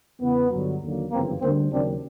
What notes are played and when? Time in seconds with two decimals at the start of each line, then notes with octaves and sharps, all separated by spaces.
0.20 E2 C#3 E3 B3
0.51 G1 G2 D3 F#3
0.81 D#2 D3 F#3 A#3
1.10 G1 F#2 C#3 E3 A#3 C4
1.41 D2 D3 G3 A#3 C4
1.71 D#2 C#3 F#3 A#3 C4 D4